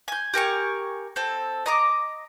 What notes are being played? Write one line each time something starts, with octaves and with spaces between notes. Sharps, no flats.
G#5 G6
G4 A#4 G#5 C#6
C4 A4
D#5 A#5 D6